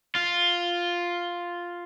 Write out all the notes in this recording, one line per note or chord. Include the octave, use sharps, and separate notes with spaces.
F4